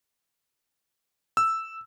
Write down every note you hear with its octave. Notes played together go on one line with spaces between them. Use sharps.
E6